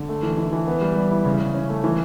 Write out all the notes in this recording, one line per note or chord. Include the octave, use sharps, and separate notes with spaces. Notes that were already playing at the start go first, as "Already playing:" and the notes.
Already playing: D3
A3
E3
E3
E3
B3
G3
G3
E4
C#3
C#3
C#4
A3
E3